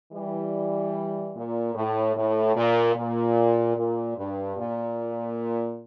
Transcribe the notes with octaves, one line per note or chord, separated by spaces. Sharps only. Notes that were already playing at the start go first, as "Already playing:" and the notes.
E3 G3
A#2
A2
A2
A#2
A#2
A#2
G2
A#2